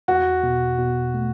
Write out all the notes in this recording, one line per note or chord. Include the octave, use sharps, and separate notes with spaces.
E2 F#4
B2
B2
A3